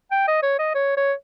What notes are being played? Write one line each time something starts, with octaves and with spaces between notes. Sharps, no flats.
G5
D#5
C#5
D#5
C#5
C#5